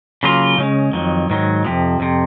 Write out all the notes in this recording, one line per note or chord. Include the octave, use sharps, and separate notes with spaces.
C#3 F#3 A#3 F4
C#3 G#3 C#4
F2 D#3 F#3
G#2 D#3 F#3
F2 C3 F3
F2 C3